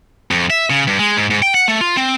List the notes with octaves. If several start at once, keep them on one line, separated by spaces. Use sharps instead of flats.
F2
E5
C#3
G2
G#3
G#2
G#2
G5
F#5
A3
F4
C4